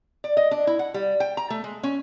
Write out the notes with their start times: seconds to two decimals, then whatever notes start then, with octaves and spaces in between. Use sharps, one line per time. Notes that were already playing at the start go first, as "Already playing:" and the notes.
0.24 D5
0.37 D#5
0.51 D4
0.67 E4
0.79 F#5
0.94 G3
1.20 G5
1.37 A#5
1.50 A3
1.64 G#3
1.83 C#4